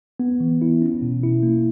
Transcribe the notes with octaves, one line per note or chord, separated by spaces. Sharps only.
B3
E3
E4
C#4
B2
E4
A#3